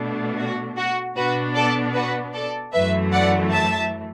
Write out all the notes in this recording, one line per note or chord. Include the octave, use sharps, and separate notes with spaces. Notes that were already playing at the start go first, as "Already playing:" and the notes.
Already playing: B2 A3 D4
F#4
F#4
B2 B3 D4 F#4 B4
A4 D5
F#4 B4
A4 D5
F#2 E3 A3 B4 E5
D5 F#5
E5 A5